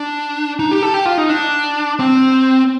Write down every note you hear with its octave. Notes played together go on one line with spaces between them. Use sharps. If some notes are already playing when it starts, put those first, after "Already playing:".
Already playing: D4
D#4
G4
A4
G4
F4
D#4
D4
C4